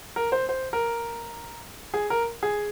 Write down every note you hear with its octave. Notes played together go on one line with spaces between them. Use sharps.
A#4
C5
C5
A#4
G#4
A#4
G#4